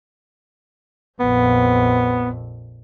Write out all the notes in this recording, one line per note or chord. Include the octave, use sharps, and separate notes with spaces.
A#1 F2 B3